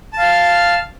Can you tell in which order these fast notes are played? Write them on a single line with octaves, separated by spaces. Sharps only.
A5 F5 F6